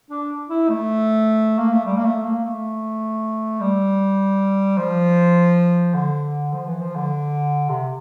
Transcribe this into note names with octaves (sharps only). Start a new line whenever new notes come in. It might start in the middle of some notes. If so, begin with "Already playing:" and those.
D4
E4
A3
A#3
A3
G3
A#3
A3
A#3
A3
G3
F3
D3
F3
E3
F3
D3
C3